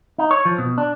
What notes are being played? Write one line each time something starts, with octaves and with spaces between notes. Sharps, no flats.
D#4
C#5
F3
B2
D4